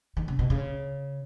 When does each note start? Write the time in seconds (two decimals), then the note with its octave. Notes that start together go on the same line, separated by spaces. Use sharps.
0.17 D#3
0.28 C#3
0.39 B2
0.50 C#3